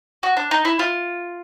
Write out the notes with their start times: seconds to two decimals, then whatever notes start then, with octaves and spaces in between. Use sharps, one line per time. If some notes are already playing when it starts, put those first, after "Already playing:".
0.23 F#4
0.37 D4
0.51 D#4
0.65 E4
0.79 F4